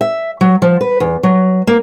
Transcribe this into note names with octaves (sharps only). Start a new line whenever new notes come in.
E5
F#3
F3
B4
E2
F#3
A#3